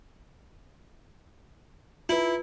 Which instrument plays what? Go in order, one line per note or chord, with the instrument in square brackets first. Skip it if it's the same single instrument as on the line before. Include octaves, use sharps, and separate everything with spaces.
[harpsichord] E4 [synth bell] F4 B4